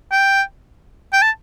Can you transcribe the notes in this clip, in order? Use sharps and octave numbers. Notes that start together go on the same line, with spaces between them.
G5
G5
A5